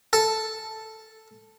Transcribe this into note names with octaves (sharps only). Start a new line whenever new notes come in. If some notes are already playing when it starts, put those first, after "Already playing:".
A4